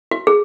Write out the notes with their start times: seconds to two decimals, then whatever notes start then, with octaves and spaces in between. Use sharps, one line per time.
0.11 F#4
0.27 G#4